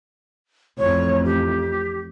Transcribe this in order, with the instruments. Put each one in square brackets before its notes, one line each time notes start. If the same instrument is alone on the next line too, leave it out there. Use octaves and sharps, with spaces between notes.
[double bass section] A1 F2 [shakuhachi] C#5
[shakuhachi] G4